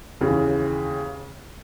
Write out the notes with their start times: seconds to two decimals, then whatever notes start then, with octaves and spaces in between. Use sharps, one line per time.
0.21 D#2 C#3 E3